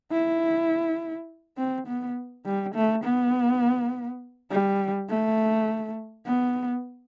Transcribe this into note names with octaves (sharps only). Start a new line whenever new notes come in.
E4
C4
B3
G3
A3
B3
G3
A3
B3